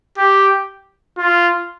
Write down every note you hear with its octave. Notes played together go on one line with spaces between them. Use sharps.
G4
F4